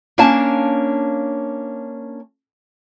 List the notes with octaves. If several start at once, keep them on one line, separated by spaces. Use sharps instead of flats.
A#3 C#4 D4 F5 G#5 A5